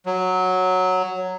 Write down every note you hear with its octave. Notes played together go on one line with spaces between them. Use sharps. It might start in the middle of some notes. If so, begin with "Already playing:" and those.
F#3